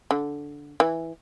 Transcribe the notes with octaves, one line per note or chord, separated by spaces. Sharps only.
D3
E3